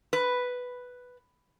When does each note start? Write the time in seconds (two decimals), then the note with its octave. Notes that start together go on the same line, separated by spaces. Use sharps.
0.13 B4